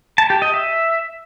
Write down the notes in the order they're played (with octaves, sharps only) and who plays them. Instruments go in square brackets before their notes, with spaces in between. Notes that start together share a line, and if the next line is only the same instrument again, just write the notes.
[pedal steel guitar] A5
G4
D#5
E5